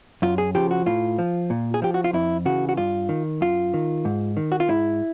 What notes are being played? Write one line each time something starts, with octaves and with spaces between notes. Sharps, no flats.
F#2 F4
G#4
C#3 F3 G4
F#4
A2 F4
F3
A#2
G#4
F3 G4
F#4
F4
F2 E4
C#3 E3 F#4
F#4
G2 F4
D#3
F#2 F4
D#3
G#2
D#3
F#4
F4
G#2 E4